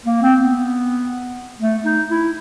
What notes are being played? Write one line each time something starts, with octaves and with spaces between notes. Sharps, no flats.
A#3
C4
B3
A3
D#4
E4